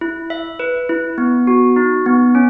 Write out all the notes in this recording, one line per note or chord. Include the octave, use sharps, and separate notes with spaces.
E4
E5
B4
E4
B3
F#4
D#4
B3
C#4